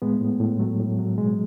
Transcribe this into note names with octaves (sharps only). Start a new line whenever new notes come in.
A2 G#3 B3
A2
A2
F#3 A3
A2
F#3
B2 G#3